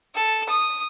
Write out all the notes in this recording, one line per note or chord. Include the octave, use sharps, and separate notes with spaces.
A4
D#6